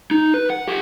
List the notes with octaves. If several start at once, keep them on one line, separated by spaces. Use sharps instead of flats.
D#4
B4
F#5
G4 F#5